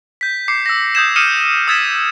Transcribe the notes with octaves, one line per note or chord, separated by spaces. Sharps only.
G6 B6
D6 C7 C#7
E6 A#6
D#6 G6 G#6 E7
D#6 F6 C#7 D#7 E7
D#6 E6 G#6 A6 B6 E7